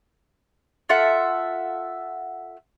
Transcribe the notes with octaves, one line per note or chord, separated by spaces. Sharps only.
F4 A4 E5 F#5